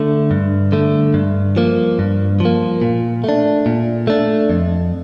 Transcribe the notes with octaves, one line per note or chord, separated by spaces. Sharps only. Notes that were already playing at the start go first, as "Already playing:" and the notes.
Already playing: D3 A3
G2
D3 A3
G2
F3 A#3
G2
F3 A#3
A#2
A3 D4
A#2
A3 D4
F2